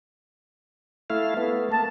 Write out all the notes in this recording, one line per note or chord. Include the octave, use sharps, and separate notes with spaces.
A3 E4 F5
A3 B3
A#3 A5